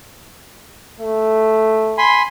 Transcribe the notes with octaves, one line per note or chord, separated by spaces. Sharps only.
A3
G#5 B5 C6